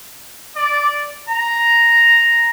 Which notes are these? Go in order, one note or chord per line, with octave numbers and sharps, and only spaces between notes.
D5
A#5